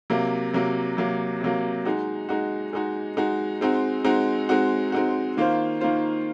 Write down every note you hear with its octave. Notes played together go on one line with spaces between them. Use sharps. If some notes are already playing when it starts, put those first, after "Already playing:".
C3 F#3 A#3
C3 F#3 A#3
C3 F#3 A#3
C3 F#3 A#3
G#3 D#4 F#4
G#3 D#4 F#4
G#3 D#4 F#4
G#3 D#4 F#4
G#3 C4 D#4 F#4
G#3 C4 D#4 F#4
G#3 C4 D#4 F#4
G#3 C4 D#4 F#4
D#3 A#3 F4 C5
D#3 A#3 F4 C5